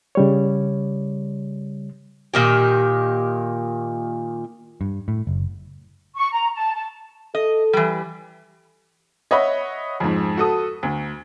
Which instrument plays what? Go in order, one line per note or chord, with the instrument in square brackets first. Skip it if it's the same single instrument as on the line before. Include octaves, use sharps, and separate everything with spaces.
[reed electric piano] C#3 G3 C#5
[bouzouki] A#2 D#3 G4
[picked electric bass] G2
A2
F#1
[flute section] C#6
A#5
A5
A5
[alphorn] A4 [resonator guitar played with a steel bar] D#5
[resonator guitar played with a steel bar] E3 G3
[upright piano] C#5 D#5 E5 F#5 B5
F2 G#2
F#4 A4 D#6
D2